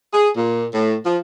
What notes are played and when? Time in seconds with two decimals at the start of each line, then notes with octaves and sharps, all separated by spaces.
0.13 G#4
0.36 A#2
0.73 A2
1.05 F3